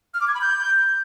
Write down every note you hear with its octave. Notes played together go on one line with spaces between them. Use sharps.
F6
D6
G#6
B5
G6